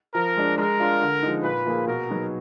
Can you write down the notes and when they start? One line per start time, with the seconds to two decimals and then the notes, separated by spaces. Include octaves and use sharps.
0.14 F3 A#4
0.37 G#3 D4
0.58 G#3 A#4
0.80 D4 F4
1.02 D3
1.23 F3 G#3 D#4
1.44 A#2 B4
1.66 F3 A#3 F4 G#4
1.87 B2 A#4
2.09 F#3 B3 D#4 G#4